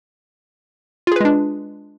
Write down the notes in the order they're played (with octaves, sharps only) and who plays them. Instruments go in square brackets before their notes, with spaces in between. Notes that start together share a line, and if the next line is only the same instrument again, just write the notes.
[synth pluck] F4
G#4
B4
G#3
D4